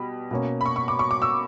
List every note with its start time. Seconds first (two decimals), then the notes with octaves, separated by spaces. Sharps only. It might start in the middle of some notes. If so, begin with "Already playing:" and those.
Already playing: B2 G3 B5
0.31 B2 A#3 C#4
0.61 B5
0.66 C#6
0.76 C#6
0.88 D6
0.99 C#6
1.11 D6
1.22 E6